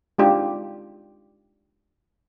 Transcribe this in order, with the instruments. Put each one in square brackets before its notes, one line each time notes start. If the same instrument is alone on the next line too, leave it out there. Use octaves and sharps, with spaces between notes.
[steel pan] G#3 D4 D#4 F4 G4